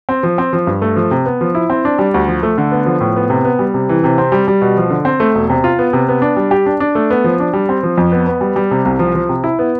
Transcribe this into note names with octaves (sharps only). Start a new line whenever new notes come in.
C4
F3
C4
F3
G2
A3
F3
C3
B3
F3
E4
C4
D4
G3
D2
F3
A3
D3
B3
F3
A2
B3
C3
B3
G3
C3
E3
C3
C4
G3
G3
B2
F3
D3
C4
A3
E1
C3
F4
B3
C3
B3
D4
G3
G4
D4
D4
A3
B3
F3
D4
G3
C4
F3
F2
B3
B3
G3
G3
C3
C2
F3
F3
C3
E4
B3